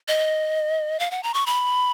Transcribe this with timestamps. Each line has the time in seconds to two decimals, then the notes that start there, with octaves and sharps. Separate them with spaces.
0.08 D#5
1.00 F5
1.11 F#5
1.23 A#5
1.34 C#6
1.46 B5